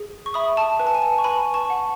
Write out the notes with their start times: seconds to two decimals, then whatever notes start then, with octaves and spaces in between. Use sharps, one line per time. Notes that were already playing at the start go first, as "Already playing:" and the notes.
Already playing: G#4
0.26 C#6
0.34 E5 B5 D#6
0.57 A5
0.80 B4 G#5
0.87 A5
0.95 G#5
1.02 A5
1.18 C#6
1.24 B4 G#5 B5
1.54 A5 C#6
1.70 F#5